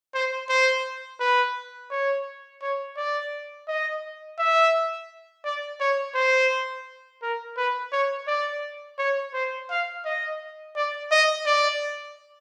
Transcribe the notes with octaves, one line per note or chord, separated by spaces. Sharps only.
C5
C5
B4
C#5
C#5
D5
D#5
E5
D5
C#5
C5
A#4
B4
C#5
D5
C#5
C5
F5
D#5
D5
D#5
D5